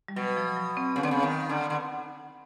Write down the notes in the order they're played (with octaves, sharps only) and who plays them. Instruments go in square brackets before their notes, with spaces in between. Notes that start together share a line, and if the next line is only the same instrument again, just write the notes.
[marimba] G3
[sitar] B2 [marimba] F#3
[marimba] F3
F#3
C4
[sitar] C#3 [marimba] B3
[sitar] D3 [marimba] C4
[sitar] C#3 [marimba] B3
[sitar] D#3
D3
D3